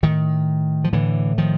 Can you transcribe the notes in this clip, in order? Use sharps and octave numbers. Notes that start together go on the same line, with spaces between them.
A2 D#3
F3
A2 D3 E3
D#3 F3